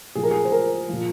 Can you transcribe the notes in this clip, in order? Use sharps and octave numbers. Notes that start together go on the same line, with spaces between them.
A#2 F3 G#4
A#4
G#4
C5
A#4
A#2 F3